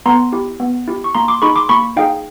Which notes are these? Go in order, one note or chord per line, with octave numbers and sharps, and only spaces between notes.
B3 A#5 C6
E4 G4
B3
E4 G4
C#6
A#3 A#5 C6
C6 D6
D#4 G#4 B5 C#6
C6 D6
A#3 B5 C#6
D#4 G#4 F5 G5